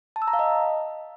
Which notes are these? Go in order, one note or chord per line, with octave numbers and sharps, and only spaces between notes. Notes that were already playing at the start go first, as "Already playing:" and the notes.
A5
E6
A#5
F5
D#5